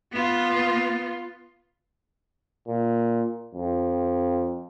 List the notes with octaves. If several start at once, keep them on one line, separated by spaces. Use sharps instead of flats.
B3 F4
A#2
F2